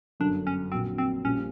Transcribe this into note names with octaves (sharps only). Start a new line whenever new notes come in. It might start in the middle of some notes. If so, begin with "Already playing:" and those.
G1 F#2 D3 D4
C#4
A#1 A#2 F#3 C4
C4
A#1 A#2 G3 C4 C#4 F4